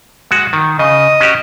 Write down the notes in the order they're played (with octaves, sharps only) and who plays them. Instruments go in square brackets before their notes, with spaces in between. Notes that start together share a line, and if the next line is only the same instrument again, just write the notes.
[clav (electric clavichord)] G#3 F#4
D#3
[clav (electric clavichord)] C#3 [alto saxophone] D#5
[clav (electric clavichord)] C#4 F#4 G4